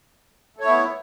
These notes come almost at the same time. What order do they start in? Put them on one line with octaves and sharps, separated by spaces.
A3 C#5 E4 B3